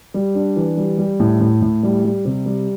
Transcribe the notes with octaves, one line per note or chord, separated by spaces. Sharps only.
G3
D4
E3
G3
G3
A2
A2
A2
G3
G3
C3
G3